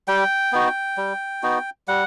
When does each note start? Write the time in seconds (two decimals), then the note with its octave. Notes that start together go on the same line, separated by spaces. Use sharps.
0.08 G3 G5
0.52 B3 D#4 F#4
0.97 G3
1.43 B3 D#4 F#4
1.88 G3 F#5